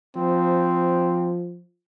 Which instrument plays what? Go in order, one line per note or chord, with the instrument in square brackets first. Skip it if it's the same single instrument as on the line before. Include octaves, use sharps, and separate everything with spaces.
[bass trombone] F3 [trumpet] C4